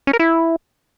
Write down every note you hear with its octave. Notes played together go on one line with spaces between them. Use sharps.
C#4
A#4
E4